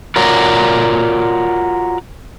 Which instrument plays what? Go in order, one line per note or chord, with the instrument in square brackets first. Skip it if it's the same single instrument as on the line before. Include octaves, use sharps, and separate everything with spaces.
[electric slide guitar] F4 F#4 A#4 C#5 D5